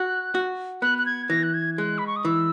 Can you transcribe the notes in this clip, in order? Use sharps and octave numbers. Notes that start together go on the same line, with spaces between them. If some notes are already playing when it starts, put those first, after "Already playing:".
Already playing: F#4 F#6
F#4
B3 F#6
F#6
G#6
E3 A#6
F#6
G#6
G#3 F#6
B5
C#6
D#6
E3 E6